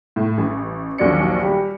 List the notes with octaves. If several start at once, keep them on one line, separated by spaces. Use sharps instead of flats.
A2
A1
A#1 D#2 F#3 D5 C#7
G3